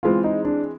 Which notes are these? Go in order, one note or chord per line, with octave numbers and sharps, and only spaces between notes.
E3 G#3 C4 F4
D#4
D4